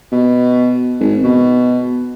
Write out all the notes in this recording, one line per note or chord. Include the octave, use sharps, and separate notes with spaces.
B2
G#1
B2